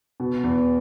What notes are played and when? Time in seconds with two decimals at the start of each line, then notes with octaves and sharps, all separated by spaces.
0.20 B2
0.43 E2